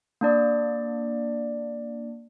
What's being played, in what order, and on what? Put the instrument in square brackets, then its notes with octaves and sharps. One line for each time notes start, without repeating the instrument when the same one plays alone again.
[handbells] A#3 D4 D5